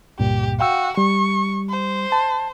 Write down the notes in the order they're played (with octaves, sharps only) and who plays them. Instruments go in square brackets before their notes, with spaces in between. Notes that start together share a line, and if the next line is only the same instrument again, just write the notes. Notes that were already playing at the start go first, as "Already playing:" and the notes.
[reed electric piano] C#2 G2 A#2 [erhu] G4
[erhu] F#4 [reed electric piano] F5 G5 E6
[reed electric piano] G3 [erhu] C#6
[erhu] C5
[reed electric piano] A5